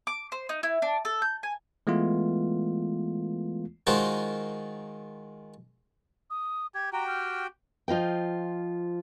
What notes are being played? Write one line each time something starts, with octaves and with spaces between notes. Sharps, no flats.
D6
C5
D#4
E4
D4
A4
G6
G#5
E3 G#3 A3 B3 F4
D#3 G#3 F4 F#4 A#4 C5
D#6
G4 G#6
F#4 G4 G5 A#5
F6
F3 F4 D#5 G5